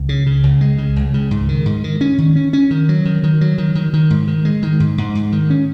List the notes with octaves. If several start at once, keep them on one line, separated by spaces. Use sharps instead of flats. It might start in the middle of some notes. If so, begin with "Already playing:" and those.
Already playing: C#2
C#3
C#3
C#2
G#3
C#3
C#2
C#3
G#2
D#3
G#2
D#3
C#4
D#3
C#4
C#4
D#3
F#3
D#3
D#3
F#3
D#3
D#3
D#3
G#2
D#3
G#3
D#3
G#2
G#2
G#2
D#3
C#4